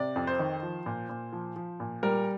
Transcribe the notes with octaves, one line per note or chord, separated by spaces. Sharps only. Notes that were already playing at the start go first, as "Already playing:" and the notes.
Already playing: C3 D5
F2
C5
D#3
F3
A#2
A#2
F3
F3
A#2
G3 A#4